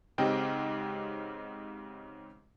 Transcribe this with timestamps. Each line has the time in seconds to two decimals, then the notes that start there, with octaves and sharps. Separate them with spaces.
0.18 G#2 C#3 C4 G4 D#5 G5